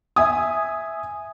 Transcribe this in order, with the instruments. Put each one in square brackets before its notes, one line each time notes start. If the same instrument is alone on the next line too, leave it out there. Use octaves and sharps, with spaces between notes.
[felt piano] E5 G#5 D#6